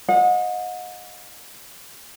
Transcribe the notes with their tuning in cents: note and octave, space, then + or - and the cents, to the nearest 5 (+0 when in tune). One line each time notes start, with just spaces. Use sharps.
D#5 +5 F#5 -40